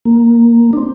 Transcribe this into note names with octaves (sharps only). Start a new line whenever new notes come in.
A#3
D4
C4